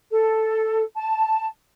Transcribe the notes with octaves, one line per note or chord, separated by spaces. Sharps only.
A4
A5